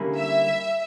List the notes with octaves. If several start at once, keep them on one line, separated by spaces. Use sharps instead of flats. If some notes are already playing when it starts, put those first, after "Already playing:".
Already playing: D3 G3 A#3 C#4 E4
E5